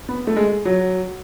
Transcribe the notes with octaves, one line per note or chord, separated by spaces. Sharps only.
B3
A3
G#3
F#3